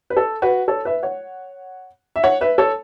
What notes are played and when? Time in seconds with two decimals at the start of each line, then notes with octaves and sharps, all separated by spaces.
0.10 B4
0.17 A4
0.42 F#4 B4
0.68 A4 C#5
0.85 B4 E5
1.03 C#5 F#5
2.16 E5
2.23 C#5 F#5
2.41 B4 E5
2.58 A4 C#5